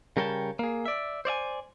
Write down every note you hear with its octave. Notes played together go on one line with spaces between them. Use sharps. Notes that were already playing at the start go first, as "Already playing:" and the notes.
C#3 G3 A#4 C#5 G5 A5
A#3 G#4
D5 E5
C5 D5 E5 G#5